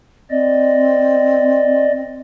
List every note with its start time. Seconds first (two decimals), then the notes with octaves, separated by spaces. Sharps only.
0.31 C4 D5 D#5